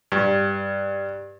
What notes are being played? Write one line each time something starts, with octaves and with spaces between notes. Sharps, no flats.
G2